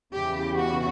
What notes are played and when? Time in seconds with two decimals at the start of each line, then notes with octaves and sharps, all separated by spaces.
0.13 E2 C#3 E3 G4
0.56 F#4